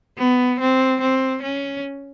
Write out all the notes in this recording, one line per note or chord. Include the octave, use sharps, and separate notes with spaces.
B3
C4
C4
C#4